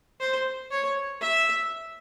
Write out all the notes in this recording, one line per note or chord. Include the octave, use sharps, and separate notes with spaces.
C5
C#5
E5